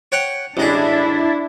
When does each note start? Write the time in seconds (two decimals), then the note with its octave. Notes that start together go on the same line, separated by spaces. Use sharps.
0.12 C#5 F#5 G5
0.57 A1 G#3 D4 E4 G#4